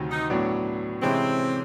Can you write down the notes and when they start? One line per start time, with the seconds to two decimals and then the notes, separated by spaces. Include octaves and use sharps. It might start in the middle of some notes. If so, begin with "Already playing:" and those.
Already playing: D2 C3 D#3 F#3
0.11 D#4
0.30 A2 F#3 B3 D4
1.02 C3 E3 G#3 C4 C#4 E4